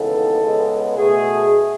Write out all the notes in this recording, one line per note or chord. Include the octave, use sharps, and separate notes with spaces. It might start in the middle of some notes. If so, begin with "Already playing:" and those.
Already playing: D#2 C#3 E3 G#3 B3 A4
C#2 C#3 G#3 B3
B2 A3 G#4